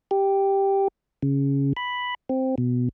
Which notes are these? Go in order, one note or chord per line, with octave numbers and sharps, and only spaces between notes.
G4
C#3
B5
C4
B2